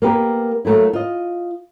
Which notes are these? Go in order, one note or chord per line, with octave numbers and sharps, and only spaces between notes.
A#3 B3 G4 A#4
F#3 A3 A#3 E4
F4 D#5